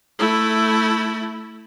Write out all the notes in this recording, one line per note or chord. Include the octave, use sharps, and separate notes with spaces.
A3 E4